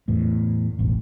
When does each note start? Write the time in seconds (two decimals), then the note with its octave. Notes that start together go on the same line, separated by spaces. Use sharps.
0.08 E2 A2
0.79 E1 A1